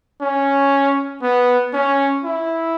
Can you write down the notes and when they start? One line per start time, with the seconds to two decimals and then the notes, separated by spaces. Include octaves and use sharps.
0.21 C#4
1.22 B3
1.74 C#4
2.24 E4